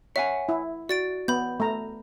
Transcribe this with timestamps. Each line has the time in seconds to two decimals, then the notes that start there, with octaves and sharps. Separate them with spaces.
0.16 C#5 E5 F#5 G#5
0.49 E4
0.89 F#4 D5 A6 D7
1.28 B3 B5 G6
1.60 A3 A#5